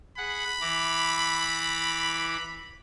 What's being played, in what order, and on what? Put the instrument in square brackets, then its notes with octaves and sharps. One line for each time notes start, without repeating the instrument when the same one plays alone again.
[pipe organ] G#4 F#5 [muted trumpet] B5
[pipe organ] E3 A#5 D6